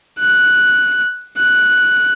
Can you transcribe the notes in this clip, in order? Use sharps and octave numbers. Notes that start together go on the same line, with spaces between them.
F#6
F#6